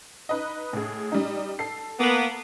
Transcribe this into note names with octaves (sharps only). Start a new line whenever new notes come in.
D#4 B4 D#5
A2 G#4
G3 D#4
A4 C7
A#3 B3